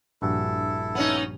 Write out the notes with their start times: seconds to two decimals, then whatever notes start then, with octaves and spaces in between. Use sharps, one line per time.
0.22 A#1 G2 E4 F#4 A4
0.95 B3 C#4 D#4